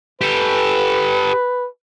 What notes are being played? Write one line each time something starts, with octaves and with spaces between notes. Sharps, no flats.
G4 A4 B4